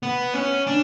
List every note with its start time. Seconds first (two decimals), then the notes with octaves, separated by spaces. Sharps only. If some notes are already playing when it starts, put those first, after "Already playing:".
0.03 B3
0.34 C#4
0.67 D4